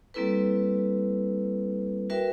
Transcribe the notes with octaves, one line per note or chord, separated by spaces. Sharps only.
G3 A#3 C4 E4 A4 B4
F#4 A#4 B4 E5 G5